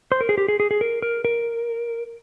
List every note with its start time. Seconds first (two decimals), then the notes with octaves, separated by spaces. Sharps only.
0.12 C5
0.21 A#4
0.29 G#4
0.38 G4
0.48 G#4
0.60 G#4
0.71 G#4
0.81 A#4
1.02 A#4
1.25 A#4